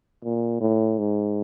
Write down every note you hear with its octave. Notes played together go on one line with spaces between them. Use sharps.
A#2
A2
G#2